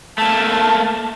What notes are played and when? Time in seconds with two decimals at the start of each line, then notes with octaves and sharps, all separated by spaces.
0.18 A3 A#3 A5